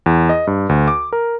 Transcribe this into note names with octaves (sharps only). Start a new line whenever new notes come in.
E2
D#5
G2
D2
D6
A#4